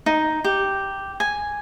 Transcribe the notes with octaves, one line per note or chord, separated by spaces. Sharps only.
D#4
G4
G#5